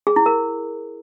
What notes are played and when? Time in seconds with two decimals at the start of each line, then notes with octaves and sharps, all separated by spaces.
0.07 G#4
0.16 E4
0.26 A#4